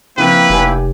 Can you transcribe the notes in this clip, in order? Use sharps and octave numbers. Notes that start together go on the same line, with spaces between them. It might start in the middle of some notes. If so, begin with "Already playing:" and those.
C#3 F3 A#3 C4 E4 B4 G5
F1 G4 G#5